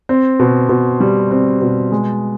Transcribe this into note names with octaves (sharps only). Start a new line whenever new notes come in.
C4
B2
B2
G3
C4
B2
G#3